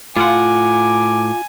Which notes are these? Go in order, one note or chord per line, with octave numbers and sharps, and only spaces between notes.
A2 F4 F#5 G#5 D6